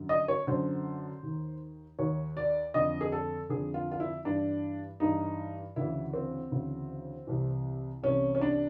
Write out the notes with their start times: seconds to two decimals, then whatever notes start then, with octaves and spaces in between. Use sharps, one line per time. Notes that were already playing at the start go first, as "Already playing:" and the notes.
Already playing: F#2 D3
0.09 D#5
0.28 C#5
0.47 F#2 D3 C5
1.23 D#2 D#3
1.99 D#2 D#3 C#5
2.37 D5
2.74 F2 D3 D#5
3.01 G#4
3.12 A4
3.49 F2 D3 G#4
3.74 F4
3.92 F4
4.00 E4
4.25 G2 E3 D4
5.00 G2 E3 D#4
5.76 D2 C#3 E3 E4
6.13 C4
6.52 D2 C#3 E3
7.27 C2 C3 E3
8.03 C2 C3 E3 C#4
8.35 C#4
8.41 D4